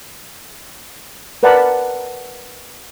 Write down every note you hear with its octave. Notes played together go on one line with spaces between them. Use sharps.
A#4 B4 D5 F#5 A5 B5